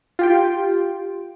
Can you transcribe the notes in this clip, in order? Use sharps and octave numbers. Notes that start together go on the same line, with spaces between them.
F4 G4 G5